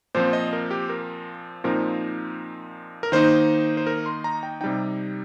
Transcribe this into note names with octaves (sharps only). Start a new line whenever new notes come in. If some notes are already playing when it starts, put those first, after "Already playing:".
A#2 F3 C4 C5
D#5
A#4
G4
A#4
A#2 F3 C4 D#4 A#4
A#4
D#3 A#3 D#4 C5
C5
A#4
C6
A#5
G5
C3 G3 D#4 G5